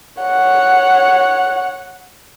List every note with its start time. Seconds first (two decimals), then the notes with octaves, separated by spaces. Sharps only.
0.22 C#5 F#5